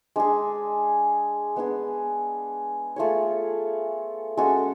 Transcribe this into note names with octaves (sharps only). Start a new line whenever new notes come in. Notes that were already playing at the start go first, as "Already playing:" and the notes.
G#3 D4 G#4
G#3 B3 D4 G#4
A3 F4 G#4 C#5
G#3 C#4 F#4 A4